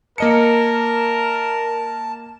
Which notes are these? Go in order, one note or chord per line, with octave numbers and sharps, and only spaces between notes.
A#3 A#4 D#5 A5 C#7